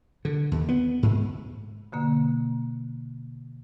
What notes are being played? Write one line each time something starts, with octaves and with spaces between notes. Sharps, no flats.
D3
D#2
B3
G#2
B2 D3 A#3